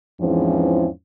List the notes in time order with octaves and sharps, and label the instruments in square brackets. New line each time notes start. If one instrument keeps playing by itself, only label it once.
[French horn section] E2 G#2 E3 F3 C4 C#4